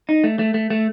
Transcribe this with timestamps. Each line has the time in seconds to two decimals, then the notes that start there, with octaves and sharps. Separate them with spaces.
0.09 D#4
0.24 A3
0.39 A3
0.54 A3
0.70 A3